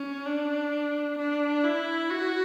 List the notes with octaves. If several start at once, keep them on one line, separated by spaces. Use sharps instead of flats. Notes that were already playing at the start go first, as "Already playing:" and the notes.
Already playing: C#4
D4
D4
E4
F#4